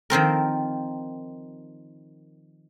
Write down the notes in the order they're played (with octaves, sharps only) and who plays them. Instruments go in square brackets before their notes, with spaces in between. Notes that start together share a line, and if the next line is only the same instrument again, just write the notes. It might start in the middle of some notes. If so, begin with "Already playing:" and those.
[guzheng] D#3 F3 C4 A#4